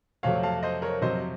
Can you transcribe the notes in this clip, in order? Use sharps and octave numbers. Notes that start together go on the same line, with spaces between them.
F2 C3 F#3 A3 C#5 F5
F5 A5
C5 D#5
A#4 C#5
F2 C3 F#3 C5 D#5